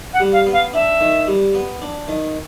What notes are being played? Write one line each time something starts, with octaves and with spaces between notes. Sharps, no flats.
F#5
G3
F5
B3
F5
D4 E5
D#3
G3
B3
D4
D#3